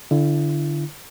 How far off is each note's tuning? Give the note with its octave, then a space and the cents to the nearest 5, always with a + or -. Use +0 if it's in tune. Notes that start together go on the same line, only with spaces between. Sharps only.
D3 +0 E4 +40